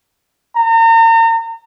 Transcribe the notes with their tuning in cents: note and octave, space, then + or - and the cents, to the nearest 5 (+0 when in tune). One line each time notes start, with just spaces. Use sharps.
A#5 -40